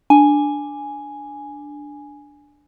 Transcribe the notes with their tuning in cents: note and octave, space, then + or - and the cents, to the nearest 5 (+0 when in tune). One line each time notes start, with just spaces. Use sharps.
D4 +0 G#5 +0